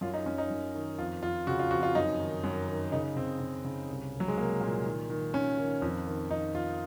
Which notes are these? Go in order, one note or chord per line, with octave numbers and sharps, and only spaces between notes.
F#2 F4
D#4
F#2 C#4
D#4
F#2
D#3
F2 F4
F2 F4
C#3 F#4
F4
F2 F#4
F4
F#2 D#4
D#3
F#2
D#3
C#3 D#4
C#3 C4
C#3
C#3
C2
C2
F#3
G#3
C2 A#3
A#2
D#3
D#3
D#3 C#4
D#3
F2
D#3
F2 D#4
F2 F4